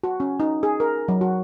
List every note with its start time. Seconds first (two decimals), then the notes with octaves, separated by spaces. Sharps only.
0.03 F#4
0.20 C#4
0.40 D#4
0.63 G#4
0.80 A#4
1.08 F#3
1.21 F#4